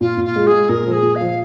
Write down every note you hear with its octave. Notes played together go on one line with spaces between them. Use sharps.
A#2 F4
A#2
F4
G#3
G#4
G#3
A#2 A#4
F3 G#4
A#2
F5
F3